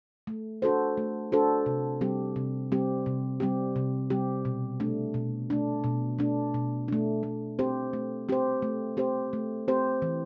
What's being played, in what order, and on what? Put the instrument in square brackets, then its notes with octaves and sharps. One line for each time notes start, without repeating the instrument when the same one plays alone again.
[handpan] A3
D4 F#4 A4 C5
A3
D4 F#4 A4 C5
C3
G3 C4 G4
C3
G3 C4 G4
C3
G3 C4 G4
C3
G3 C4 G4
B2
A3 D4
B2
A3 D4
B2
A3 D4
B2
A3 D4
A3
C4 G4 C5
A3
C4 G4 C5
A3
C4 G4 C5
A3
C4 G4 C5
E3